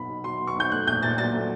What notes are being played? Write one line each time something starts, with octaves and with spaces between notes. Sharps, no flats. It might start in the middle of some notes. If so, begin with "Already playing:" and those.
Already playing: B1 B3 B5
B2
F#3 C6
B3
C#6
B1 G6
A3 F#6
A#1 G6
A#2 A6
F#3 A6
A3